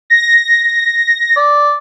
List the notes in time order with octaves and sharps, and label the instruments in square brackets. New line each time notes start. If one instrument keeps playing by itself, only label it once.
[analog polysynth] A#6
[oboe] D5